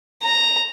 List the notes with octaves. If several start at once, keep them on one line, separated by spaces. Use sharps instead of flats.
A#5